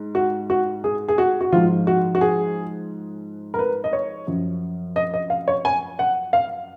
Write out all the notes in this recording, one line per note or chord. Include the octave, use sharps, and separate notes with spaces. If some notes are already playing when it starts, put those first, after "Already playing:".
Already playing: G#2
F#4
F#4
G#4
G#4
F#4
F#4
G#2 F3 F4
F#4
F#4
G#4
A#4
B4
D#5
C#5
F#2 F3
D#5
D#5
F5
C#5
G#5
F#5
F5